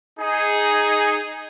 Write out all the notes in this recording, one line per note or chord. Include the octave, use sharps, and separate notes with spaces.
D#4 G#4